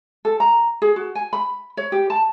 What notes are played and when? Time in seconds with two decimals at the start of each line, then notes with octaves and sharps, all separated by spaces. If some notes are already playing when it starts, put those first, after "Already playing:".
0.25 A4
0.40 A#5
0.82 G#4
0.96 F#4
1.15 G#5
1.33 B5
1.77 C#5
1.92 G4
2.10 A5